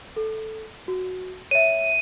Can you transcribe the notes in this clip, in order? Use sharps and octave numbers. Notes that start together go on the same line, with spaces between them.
A4
F#4
C#5 E5 D#7